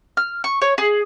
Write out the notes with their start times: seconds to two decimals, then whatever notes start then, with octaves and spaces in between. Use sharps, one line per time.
0.17 F6
0.44 C#6
0.62 C#5
0.78 G#4